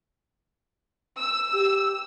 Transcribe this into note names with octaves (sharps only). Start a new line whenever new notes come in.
E6
G4